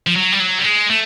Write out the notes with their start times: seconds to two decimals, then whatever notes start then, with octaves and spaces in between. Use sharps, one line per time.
0.07 F3
0.16 F#3
0.32 G3
0.40 F#3
0.59 G3
0.64 G#3
0.90 A3